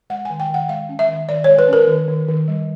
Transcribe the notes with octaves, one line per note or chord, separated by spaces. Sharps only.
G#3 F#5
G#5
D#3
G5
D#3 F#5
G#3 F5
C#4
E5
D#3
D#3 D5
C#5
G#3
B4
C#4 A#4
D#3
D#3
D#3
G3